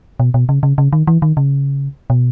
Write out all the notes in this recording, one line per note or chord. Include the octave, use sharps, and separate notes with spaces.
B2
B2
C#3
C#3
C#3
D#3
E3
D#3
C#3
B2